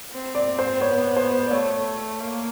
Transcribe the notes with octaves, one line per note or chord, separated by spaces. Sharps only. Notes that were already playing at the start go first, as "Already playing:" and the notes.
C4
D5
C5
B3 C#5
C5
D5
A3 C#5
A#3